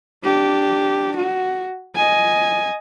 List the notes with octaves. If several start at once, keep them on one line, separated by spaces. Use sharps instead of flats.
D4 G4
F#4
D#5 G#5